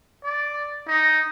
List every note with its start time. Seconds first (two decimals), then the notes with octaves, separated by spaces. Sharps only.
0.24 D5
0.88 D#4